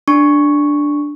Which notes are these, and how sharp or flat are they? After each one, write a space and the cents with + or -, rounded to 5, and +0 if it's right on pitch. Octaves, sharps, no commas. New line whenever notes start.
D4 +0 C#6 +0